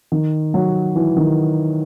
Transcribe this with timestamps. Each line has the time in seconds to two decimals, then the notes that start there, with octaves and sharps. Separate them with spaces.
0.12 D#3
0.54 F#3
0.96 E3
1.17 D#3